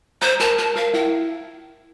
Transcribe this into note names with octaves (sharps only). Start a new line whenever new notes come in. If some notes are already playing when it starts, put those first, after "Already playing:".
C5 A#5
A#4 A5
A#4 A5
A#4 F5
E4 G5